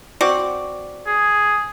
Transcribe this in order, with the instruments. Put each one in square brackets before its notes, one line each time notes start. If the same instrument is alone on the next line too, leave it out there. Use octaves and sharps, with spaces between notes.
[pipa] C4 F#4 D5
[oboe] G#4